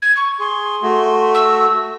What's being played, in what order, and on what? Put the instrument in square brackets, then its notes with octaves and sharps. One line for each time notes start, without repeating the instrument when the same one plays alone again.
[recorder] G#6
C#6
[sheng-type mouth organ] G#4 [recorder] C6
[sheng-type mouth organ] A3 F#4
[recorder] E6